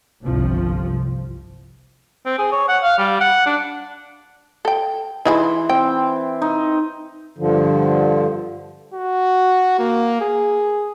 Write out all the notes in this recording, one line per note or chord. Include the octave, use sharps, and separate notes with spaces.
G1 C2 C3 F3
C4
G#4
C#5
F#5
F5
G3
F#5
D4
A4 G5
E3 D#4 E4 G#4 C6
C4 G5
D#4
G2 D3 F3
F#4
A#3
G#4